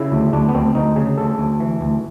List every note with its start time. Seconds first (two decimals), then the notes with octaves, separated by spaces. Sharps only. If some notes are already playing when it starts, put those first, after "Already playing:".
Already playing: C#3 E4
0.12 D2
0.33 D2 D4
0.49 B3
0.55 D2 C4
0.75 D2 D#4
0.96 C#3 G#4
1.18 D2 A4
1.38 D2
1.60 E3
1.81 D2